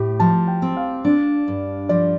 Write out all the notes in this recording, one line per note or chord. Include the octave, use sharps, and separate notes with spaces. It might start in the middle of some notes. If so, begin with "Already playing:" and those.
Already playing: A2 G4
F3 A5
G5
C4
F5
D4
G2
F3 D5